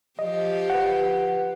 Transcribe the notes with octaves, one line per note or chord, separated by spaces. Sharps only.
F3 G4 D#5
B4 F#5